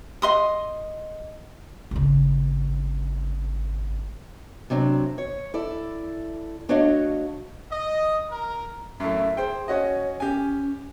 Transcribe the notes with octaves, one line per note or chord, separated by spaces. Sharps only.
D#5 C6 D#6
G#1 C#3
C3 F#3 D4
C#5
E4 A4 D5
A3 D4 F#4 C#5 D#5 F5
D#5
A#4
F#2 A2 E5
G#4 C5 G5
C#4 F#4 C#5 D#5
C#4 G4 G#5